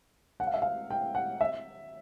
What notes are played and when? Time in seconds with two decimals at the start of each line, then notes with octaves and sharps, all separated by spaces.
0.40 F#5
0.47 F5
0.54 E5
0.62 F5
0.90 G5
1.15 F#5
1.41 E5